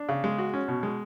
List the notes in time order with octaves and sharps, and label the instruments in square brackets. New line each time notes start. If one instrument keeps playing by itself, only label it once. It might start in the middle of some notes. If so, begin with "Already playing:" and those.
Already playing: [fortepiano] D4
C#3
G#3
F#4
C#4
B2
G#3